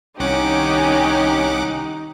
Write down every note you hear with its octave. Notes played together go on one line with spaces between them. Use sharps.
C2 D#3 C#4 D#4 G4 F#5 D6